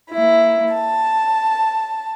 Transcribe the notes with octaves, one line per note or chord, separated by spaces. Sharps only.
A#3 E4
A5